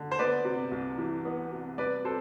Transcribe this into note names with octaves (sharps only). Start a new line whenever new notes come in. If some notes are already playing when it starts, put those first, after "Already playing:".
Already playing: D3
C5
B3 B4 D5
C3
C2
E3
B3
C3
G3 B4 D5
C3 A4 C5